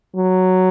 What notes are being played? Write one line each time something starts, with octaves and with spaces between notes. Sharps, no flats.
F#3